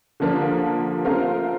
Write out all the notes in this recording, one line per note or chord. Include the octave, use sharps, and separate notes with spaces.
D3 F3 A#3 D4
A3 C4 F4 A#4